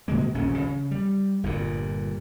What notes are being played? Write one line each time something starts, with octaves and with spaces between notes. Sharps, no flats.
B2 D3 G#3 A#3
D#1 A#1 C#3 C#4
C#3
G3
G1 G2 A#2